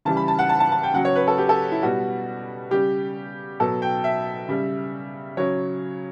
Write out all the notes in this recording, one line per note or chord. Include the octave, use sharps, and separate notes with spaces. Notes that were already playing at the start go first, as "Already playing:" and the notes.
C#3 E3 G3 A5
B5
A5
F#5
A5
A5
A5
G5
C#3 F#3 F#5
C#5
B4
A4
G4
A4
E4
B2 G3 F#4
C#3 G3 G4
B2 F#3 A4
G5
E5
C#3 G3
C#3 F#3 C#5